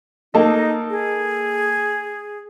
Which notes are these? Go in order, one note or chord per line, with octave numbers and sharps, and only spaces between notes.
A#3 D#4 A4 D#5
G#4